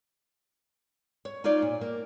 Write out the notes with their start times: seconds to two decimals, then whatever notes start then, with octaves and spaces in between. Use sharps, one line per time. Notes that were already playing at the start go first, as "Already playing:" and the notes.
1.25 C#5
1.44 D#4 F4 C#5 D5 F5
1.62 A#2
1.81 A#3